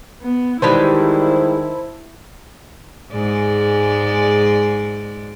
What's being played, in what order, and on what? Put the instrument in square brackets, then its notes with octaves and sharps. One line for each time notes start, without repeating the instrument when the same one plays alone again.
[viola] B3
[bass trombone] D#3 [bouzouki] E3 G3 G#3 [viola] E4 [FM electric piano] C5 A5 B5
[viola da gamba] G#2 G#3 D5